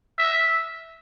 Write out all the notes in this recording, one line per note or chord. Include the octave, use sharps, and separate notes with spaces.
E5